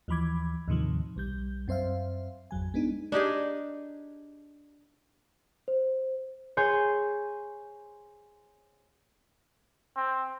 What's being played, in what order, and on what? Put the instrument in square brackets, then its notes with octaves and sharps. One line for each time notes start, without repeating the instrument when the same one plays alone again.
[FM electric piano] D#2 E3 F3 B5 D6 G#6
D#2 A2 C3 D#3 F3
B1 G3 G6
F#2 C4 C5 E5 F5
G#1 F2 F#3 G#5
G#3 B3 D4 D#4
[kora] D4 D#4 G4 G#4
[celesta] C5
[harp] G#4 C#5 G#5 C6 G6
[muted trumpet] C4